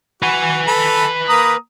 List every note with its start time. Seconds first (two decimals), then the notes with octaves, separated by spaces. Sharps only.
0.22 F#4 B4 G#5
0.67 A4 B5
1.29 A#3 A#5 D#6